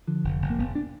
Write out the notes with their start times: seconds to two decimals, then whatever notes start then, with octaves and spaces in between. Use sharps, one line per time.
0.07 D3 F3
0.24 F1
0.41 F1
0.50 A#3
0.59 F1 B3
0.75 D4